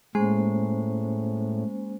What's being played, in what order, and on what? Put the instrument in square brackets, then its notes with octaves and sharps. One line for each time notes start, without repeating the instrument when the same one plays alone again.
[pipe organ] A2 [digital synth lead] G#3 [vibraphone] A#3 C#4 C5